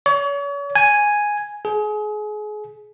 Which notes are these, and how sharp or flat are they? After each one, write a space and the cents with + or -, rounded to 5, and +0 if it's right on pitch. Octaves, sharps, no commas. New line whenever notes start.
C#5 +40
G#5 +0
G#4 +30